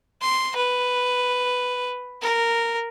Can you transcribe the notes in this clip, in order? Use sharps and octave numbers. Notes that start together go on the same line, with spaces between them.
C6
B4
A#4